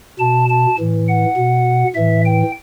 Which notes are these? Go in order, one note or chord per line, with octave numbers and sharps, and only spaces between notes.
B2 A5
A5
A2 E3
F#5
B2
A2 E3 E5
G5